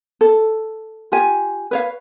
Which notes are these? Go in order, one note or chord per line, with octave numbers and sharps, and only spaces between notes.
A4
F4 G4 G#5
B4 C#5 F5